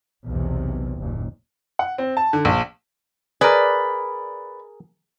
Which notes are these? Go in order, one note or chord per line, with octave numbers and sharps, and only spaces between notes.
B1 E2 C3
F#1 D#2 A#2
F#5
C4
A5
D3
A#1
G#4 A#4 B4 D5